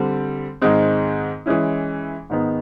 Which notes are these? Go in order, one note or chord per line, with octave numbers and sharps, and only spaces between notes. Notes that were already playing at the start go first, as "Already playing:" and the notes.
Already playing: D3 G3 C4
G#2 D#3 G#3 C4
E3 G#3 C#4 E4
G#2 D#3 G#3 B3